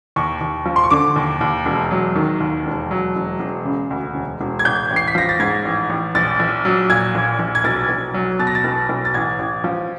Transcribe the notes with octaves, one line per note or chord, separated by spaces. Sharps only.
D#2 C#6
D#2
F3
C6
C#6
D3 D6
D#2
D#2
E1
F#3
D#3
D#2
E1
F#3
E1
E1
C#3
D2
E1
E1
G#6
A1 G6
A1
C7
B6
F3 A#6
A6
G#2 G#6
A1
A1
A#1 A6
A#1
F#3
A#2 G#6
A#1
A#1
G#6
B1 A6
B1
F#3
B2 A6
A#6
A6
B1
B1
A6
A1 G#6
A1
F3